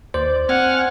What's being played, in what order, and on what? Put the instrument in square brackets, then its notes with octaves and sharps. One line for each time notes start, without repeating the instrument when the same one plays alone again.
[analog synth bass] D#2 [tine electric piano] C5 [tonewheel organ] D5
[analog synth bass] C4 [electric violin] F#5 [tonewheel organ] G#5 F6